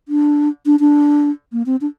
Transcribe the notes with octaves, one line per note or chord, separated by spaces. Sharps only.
D4
D4
D4
A#3
C4
D4